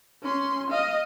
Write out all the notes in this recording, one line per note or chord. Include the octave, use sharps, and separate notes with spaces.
C#4 C6
D#5 F5